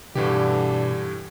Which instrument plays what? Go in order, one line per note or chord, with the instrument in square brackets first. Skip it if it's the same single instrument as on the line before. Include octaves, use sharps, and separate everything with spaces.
[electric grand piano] G2 E3 G4 [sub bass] B2 [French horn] D3